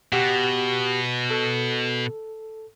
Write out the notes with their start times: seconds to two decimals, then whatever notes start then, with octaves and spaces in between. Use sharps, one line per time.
0.13 B2 G4 F#5
1.30 A4